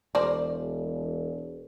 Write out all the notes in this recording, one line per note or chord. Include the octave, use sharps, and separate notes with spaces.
E1 A#4 C5 D5